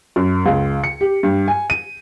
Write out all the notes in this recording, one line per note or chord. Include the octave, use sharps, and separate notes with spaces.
F#2
C#2
C#7
G4
G2
G#5
D#7